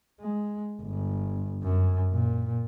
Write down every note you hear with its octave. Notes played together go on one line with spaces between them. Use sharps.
G#3
G1
F#2
A#2